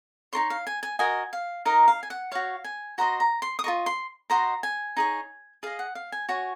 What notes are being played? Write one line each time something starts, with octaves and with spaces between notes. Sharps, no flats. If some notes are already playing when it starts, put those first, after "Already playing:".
D#4 A#4 C#5 C6
F5
G#5
G#5
F#4 A#4 D#5 G#5
F5
D#4 A#4 D#5 F5
F5
G#5
F#5
F#4 C#5 F5
G#5
F#4 C5 D#5 A#5
A#5
C6
D#6
F4 A#4 D#5 C#6
C6
F#4 C5 D#5 A#5
G#5
D#4 G#4 C#5
G#4 D#5 F5
F#5
F5
G#5
F#4 C#5 G#5